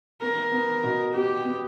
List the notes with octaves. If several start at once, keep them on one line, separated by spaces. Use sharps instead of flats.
B3 A#4
B3
B2
B3 G4
B3